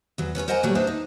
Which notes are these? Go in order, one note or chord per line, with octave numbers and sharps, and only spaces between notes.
E2 F#3
B3 C#4 A4 C#5
A#4 C5 D#5 F#5 G#5 A#5
A#2 F#3 G3 A3
B3 D4 D#4 C5 E5
D#4